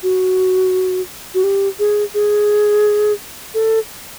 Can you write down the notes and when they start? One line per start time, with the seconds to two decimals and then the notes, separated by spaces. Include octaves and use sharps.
0.03 F#4
1.34 F#4
1.44 G4
1.79 G#4
2.14 G#4
3.54 A4